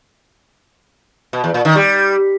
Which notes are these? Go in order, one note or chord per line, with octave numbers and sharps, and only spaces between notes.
B2
E2
A#2
D#3
G3